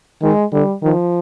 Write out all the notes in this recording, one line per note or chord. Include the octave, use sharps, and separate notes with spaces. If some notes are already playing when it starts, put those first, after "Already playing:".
D#3 G#3
D3 G3
D#3 F3